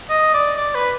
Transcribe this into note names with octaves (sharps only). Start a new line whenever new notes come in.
D#5
D5
D5
B4